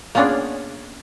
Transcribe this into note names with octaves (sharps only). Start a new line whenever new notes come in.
A#3 B3 C#4 D4 F4 G#4